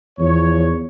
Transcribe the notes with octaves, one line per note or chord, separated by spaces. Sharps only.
E2 F3 C#5